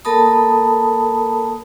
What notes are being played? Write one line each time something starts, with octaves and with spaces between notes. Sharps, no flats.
A#3 A4 A#4 A5 B5 D#6